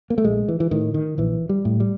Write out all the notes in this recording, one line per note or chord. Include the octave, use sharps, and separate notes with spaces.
A#3
A3
A#1 G#3
E3
E3
A2 D#3
D#3
A#1 E3
G3
A2
G3